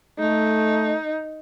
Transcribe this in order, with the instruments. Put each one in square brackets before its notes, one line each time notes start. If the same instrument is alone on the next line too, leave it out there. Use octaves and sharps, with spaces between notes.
[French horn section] A3 [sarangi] D#4